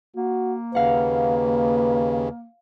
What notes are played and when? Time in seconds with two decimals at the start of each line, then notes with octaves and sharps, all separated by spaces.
0.16 A#3 F#4
0.75 D#2 C#3 B4 F5 F#5